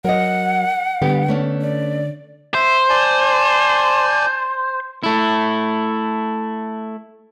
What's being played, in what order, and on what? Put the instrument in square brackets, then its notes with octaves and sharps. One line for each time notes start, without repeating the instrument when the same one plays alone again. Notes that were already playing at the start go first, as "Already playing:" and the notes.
[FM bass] F#3 [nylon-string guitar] A#4 D#5 [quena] F#5
[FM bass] D3 [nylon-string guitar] G3 B3 G4
[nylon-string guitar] A3 C#4 D4
[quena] D5
[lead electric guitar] C5 [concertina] E5
[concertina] D5 G#5 A5
[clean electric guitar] A3 E4